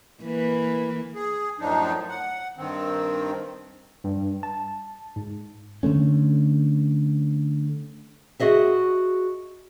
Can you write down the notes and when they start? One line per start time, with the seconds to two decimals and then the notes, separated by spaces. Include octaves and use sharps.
0.23 E3 A#3 B4
1.15 G#4
1.60 F#2 A2 F3 D4 D#4
2.09 F#5
2.57 G2 D#3 C4
4.04 G2
4.43 A5
5.16 G#2
5.83 D3 F#3 A3 C#4
8.40 F#4 G#4 D#5 E5